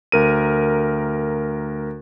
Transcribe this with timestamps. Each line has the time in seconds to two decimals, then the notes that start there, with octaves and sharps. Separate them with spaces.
0.12 D2 A#4 D#7